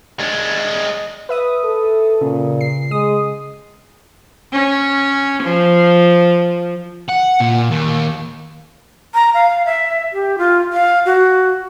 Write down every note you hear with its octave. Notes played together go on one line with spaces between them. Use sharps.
G#3 D4
B4 E5 D#6
A4
A#2 C#3
C7
G#3 D#6
C#4
F3
F#5
A#2
D#2
A#5
F5
E5
G4
F4
F5
F#4